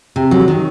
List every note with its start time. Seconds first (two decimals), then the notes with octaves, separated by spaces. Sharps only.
0.16 C3
0.31 F#3
0.48 D#3